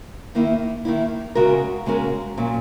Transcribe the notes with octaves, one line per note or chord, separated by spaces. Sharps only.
D#3 A#3 E4
D#3 A#3 E4
C#3 G#3 C#4 F#4 A#4
C#3 G#3 C#4 F#4 A#4
A#2 F#3 C#4